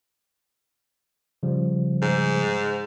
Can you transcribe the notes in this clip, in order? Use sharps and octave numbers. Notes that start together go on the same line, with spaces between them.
C#3 F3 G3
G#2